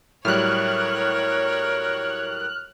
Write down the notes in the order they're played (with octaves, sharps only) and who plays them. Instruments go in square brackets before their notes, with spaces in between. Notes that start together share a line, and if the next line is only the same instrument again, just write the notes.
[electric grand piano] A2 F#3 G3 [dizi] A#4 [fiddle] C#5 [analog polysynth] F6 F#6